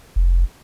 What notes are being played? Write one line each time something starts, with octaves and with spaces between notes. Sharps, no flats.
F1